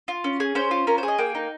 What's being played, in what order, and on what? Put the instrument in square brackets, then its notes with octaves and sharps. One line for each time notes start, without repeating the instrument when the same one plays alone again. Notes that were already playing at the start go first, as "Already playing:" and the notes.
[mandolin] F4
C#4
G#4
C#4 C5
F4
C#4 A#4
C5
G#4
D#5
A#3 G5
D#4